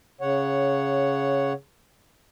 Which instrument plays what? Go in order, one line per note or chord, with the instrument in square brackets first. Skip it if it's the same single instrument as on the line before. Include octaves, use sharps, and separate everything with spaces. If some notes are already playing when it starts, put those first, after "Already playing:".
[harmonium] C#3 C#5 F#5